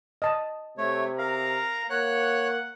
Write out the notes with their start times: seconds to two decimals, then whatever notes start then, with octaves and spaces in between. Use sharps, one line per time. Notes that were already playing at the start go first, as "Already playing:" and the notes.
0.22 D#5 A5
0.78 C3 A3 C#5
1.18 A#4 F5 A#5
1.90 A#3 C#5 F#5 F#6